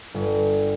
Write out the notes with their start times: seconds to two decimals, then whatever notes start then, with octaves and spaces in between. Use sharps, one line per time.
0.14 G1